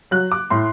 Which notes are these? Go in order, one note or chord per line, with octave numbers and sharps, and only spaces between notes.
F#3 F#6
D6
A2 C6